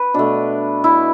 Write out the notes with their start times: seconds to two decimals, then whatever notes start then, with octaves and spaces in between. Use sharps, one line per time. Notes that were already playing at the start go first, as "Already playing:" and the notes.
Already playing: B4
0.14 B2 A3 D4
0.84 E4